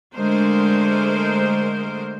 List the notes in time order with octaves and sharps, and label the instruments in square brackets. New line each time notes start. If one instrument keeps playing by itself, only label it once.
[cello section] D3 G#3 A3 A#4 C5